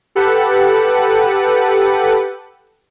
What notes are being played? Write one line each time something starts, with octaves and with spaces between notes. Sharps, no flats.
G4 A4 B4 F#5